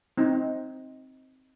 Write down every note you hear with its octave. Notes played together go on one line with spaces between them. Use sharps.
C4 D#4